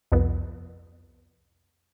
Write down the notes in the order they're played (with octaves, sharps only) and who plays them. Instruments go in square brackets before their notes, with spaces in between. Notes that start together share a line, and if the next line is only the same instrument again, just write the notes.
[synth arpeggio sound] C2 F2 B3